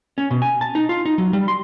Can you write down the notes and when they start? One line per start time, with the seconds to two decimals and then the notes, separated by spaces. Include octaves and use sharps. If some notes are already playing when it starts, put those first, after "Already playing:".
0.18 C#4
0.31 B2
0.42 G#5
0.61 A5
0.75 D#4
0.89 F4
1.05 D#4
1.18 F#3
1.33 G3
1.48 C6